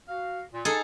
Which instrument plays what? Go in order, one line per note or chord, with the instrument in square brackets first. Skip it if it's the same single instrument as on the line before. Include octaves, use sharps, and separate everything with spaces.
[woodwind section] F#4 F5
A#2
[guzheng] D#4 G#4 A4 [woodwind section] A5